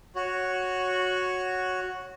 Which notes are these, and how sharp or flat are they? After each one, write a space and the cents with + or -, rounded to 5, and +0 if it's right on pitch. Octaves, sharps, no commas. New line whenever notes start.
F#4 -5 C#5 +0